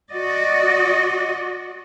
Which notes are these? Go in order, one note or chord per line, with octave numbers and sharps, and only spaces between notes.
F#4 D5 D#5